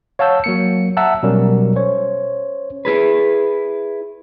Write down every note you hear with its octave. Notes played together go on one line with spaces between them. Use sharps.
C#5 F5 F#5 A5 E6 G6
F#3 A#3 C#7
E5 F#5 A5 A#5 E6
B2 F#3 G3 C#4 A#4
C#4 C5 C#5
E4 G#4 B4